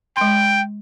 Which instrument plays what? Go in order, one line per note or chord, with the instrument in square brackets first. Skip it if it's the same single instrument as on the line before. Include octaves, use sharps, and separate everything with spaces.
[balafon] G#3 C6 [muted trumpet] G5